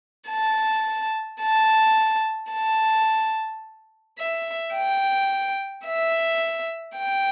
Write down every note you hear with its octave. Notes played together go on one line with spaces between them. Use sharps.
A5
A5
A5
E5
G5
E5
G5